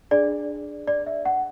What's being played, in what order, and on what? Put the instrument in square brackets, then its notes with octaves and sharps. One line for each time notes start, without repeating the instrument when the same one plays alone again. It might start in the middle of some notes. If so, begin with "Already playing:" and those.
[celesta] D4 G#4 D5
D5
E5
F#5